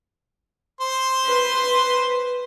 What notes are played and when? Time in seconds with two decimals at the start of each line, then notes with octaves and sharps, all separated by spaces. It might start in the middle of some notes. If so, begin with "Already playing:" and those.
0.81 C5 C6
1.26 B4